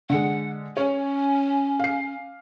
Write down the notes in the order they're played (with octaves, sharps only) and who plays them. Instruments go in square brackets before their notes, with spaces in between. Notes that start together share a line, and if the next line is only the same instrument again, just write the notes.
[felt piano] D3 G#3 [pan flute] F#5
[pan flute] C#4 [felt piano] C#5
[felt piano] F5 C7